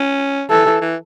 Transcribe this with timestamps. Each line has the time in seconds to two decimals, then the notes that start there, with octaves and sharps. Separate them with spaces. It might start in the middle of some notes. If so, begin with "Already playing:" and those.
Already playing: C#4
0.50 E3 A4
0.66 E3
0.81 E3